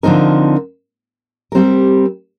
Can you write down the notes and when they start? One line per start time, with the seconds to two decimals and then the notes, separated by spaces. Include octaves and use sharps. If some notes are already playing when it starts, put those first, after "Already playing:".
0.03 D3 F3 C4 D#4 A#4
1.52 G3 C4 G4 A#4